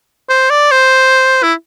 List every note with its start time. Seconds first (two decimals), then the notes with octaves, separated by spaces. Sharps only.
0.30 C5
0.50 D5
0.71 C5
1.43 E4